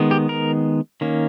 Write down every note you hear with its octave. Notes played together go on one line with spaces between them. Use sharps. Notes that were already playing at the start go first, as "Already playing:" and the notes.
Already playing: D#3 G#3 B3
G4
A#4
D#3 A#3 C#4